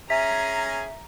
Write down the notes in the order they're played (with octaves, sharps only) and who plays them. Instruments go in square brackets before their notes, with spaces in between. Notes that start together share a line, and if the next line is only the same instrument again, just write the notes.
[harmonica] C#4 G#4 G#5 [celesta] E5 B6 [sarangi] A#5